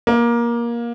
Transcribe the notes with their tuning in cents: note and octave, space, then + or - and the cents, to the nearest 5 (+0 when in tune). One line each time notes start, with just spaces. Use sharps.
A#3 +20